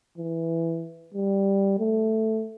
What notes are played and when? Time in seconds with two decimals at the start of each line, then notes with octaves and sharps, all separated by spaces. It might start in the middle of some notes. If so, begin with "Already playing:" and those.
0.18 E3
1.14 G3
1.79 A3